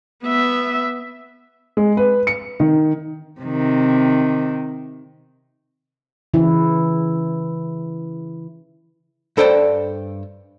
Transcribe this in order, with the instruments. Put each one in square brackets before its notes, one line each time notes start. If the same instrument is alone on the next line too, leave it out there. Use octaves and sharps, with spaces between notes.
[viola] B3 E5
[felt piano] G#3
B4
C#7
D#3
[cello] C3 D#3
[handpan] C#3 E3 E4
[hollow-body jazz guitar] G2 A4 C5 D5 G5 A5